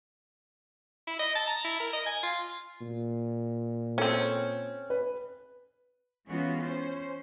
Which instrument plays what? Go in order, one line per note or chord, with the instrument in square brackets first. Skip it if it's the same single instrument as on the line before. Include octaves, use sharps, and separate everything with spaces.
[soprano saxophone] E4
D#5
A5
A#5
E4
A#4
D#5
G#5
F4
[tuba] A#2
[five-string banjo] C4 C#4 [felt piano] A4
[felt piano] B4
[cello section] E3 G#3 B3 C#4 F4 F#4
C#4 C5